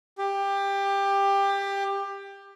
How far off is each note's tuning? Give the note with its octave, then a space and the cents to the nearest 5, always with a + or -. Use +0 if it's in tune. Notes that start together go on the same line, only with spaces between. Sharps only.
G4 +20